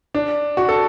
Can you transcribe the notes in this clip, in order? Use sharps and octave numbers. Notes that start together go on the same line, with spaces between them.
D4
F#4
A4